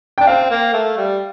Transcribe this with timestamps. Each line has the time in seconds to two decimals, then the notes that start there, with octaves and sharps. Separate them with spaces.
0.18 D4 G5
0.27 C4 F5
0.50 A#3
0.73 A3
0.97 G3